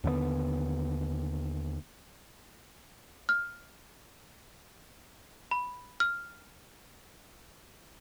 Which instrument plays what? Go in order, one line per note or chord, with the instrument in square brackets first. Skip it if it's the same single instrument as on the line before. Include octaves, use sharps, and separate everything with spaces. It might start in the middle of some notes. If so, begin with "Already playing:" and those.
[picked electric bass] D#2 D3 D#3 B3
[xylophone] F6
B5
F6